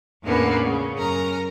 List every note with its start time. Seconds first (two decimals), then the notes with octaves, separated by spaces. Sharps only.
0.23 E2 A2 D3 A#3 B3 C#4
0.61 C#3
0.95 F#2 C#4 A#4 A#5